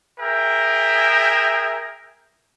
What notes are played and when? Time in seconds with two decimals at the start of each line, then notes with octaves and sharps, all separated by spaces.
0.20 G#4 A#4 E5 G5